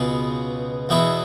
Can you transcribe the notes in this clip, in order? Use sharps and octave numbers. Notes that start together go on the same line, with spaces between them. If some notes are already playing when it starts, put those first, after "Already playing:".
Already playing: C#2 B2 B3 G#4
E2 B2 B3 E4 G#4